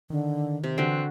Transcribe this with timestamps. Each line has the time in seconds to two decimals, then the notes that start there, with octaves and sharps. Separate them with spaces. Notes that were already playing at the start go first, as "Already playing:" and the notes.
0.10 D3 D#3
0.64 C3
0.78 D3 E3 C4 F#4